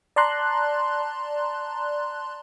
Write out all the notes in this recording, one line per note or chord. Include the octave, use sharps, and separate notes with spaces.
D5 A5 A#5 C6 F#6